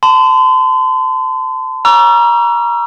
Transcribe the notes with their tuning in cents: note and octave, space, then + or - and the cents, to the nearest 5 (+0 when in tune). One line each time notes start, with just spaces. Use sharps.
A5 +15 C6 -40
A#5 +25 C#6 +45 E6 +40